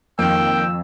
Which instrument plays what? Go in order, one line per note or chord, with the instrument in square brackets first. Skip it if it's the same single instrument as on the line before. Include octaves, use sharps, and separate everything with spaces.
[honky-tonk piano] F2 [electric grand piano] D#3 A#3 [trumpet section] G5 [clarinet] E6